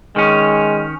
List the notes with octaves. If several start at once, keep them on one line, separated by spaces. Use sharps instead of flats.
D#3 G#3 C#4